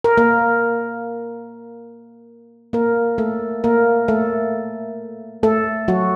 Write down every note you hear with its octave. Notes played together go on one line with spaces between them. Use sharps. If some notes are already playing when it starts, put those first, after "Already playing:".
A#4
A#3 A#4
A#3 A#4
A3 A4
A#3 A#4
A3 A4
A3 A4
F#3 F#4